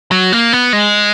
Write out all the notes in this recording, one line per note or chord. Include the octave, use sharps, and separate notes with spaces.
F#3
A#3
B3
G#3